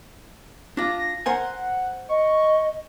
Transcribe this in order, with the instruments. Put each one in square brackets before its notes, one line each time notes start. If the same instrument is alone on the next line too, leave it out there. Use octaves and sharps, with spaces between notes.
[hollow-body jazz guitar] D4 F4 [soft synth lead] A#6
[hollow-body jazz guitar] A#4 C5 G#5 [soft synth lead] F#5
[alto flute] D#5 [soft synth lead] C#6